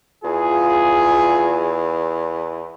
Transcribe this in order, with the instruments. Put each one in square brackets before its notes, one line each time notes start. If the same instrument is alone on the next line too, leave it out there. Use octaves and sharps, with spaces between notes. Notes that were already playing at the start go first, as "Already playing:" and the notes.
[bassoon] E2 [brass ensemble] F4 G#4